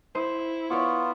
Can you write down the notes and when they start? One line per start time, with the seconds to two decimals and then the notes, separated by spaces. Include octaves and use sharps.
0.15 E4 C5
0.70 B3 F4 C#5 D5 C#6